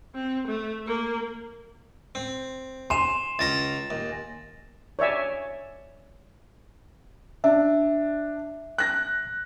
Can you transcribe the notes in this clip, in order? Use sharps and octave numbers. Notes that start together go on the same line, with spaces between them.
C4
A3
A#3
C4
G#5 C6 E7 F7
C#2 C#4 A#5 A6 A#6
D#2
C#5 D5 E5 G#5
D4 E5
F#6 A#6